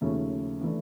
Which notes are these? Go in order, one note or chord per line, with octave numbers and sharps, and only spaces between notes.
D#2 C#3 F3 A3 C#4
E3 A3 D4